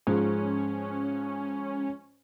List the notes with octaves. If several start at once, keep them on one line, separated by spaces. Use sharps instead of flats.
G#2 F3 C#4 G#4